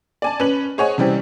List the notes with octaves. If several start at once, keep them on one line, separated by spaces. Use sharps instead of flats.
D5 G#5 A5
C#4 B4 F#7
G#4 C5 C#5 D#5 F#5 G#5
C3 E3 G3 C4 C#4